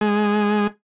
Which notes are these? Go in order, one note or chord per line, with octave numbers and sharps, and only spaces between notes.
G#3